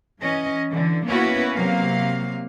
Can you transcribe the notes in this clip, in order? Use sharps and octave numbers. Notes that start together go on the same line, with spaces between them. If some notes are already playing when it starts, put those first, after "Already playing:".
E3 C#4 D#5
D3 E3
A#3 B3 C#4 E4 F#4 B4
C3 F#3 A#3 F5